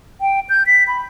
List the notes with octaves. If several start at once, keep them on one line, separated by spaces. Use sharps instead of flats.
G5
G6
B6
B5